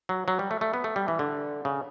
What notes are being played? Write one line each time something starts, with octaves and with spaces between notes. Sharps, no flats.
F#3
F#3
G3
A3
A3
B3
A3
G3
E3
D3
C#3